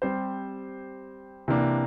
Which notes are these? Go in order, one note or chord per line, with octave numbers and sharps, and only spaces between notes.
G3 C4 G4 C5
C3 E3 A#3 D4